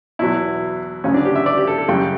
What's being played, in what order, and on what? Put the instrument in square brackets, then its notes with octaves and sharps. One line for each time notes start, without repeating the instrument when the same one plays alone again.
[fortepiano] E2 B2 F#3 E4
D2 C#3 F#3 C#4
D4
G4
E5
D5
G4
A4
A4
F#2 C#3 G3 G5